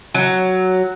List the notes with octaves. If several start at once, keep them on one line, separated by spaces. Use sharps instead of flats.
F#3